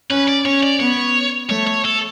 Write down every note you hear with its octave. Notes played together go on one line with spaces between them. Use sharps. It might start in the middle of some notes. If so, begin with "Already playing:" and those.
C#4 B4
D5
C#4 C#5
D5
B3 C#5
A3 C#5
C#5
A4